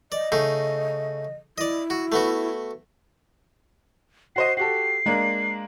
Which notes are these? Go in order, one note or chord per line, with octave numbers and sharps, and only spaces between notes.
D5 D#5
C#3 A3 D#4
E4 D5 D#5
F#4
A3 B3 F#4
F#4 C5 D#5 C7
F#4 G4 A4 C7
G#3 A#3 D4